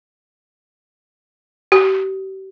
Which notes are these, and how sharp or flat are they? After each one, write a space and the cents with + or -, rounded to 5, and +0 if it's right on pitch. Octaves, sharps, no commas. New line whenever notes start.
G4 -35